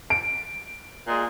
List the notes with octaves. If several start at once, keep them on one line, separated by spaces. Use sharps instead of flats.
D7
A#2 G#3